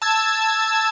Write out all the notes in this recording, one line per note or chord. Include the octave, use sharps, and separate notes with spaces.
A5 E6 G#6